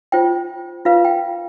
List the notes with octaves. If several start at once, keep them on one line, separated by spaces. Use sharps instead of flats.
F4 C5 G5
F4 B4 F5
G5